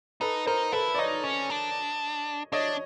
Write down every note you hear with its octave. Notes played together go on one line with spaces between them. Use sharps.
D#4 A4 B4
D#4 A#4 C5
E4 A4 B4
D5
D#4 C#5 D#5
C#4
D4
D4 C#5 D#5